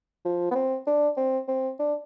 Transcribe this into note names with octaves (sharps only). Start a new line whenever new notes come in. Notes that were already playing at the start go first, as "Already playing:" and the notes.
F3
B3
C4
D4
C4
C4
D4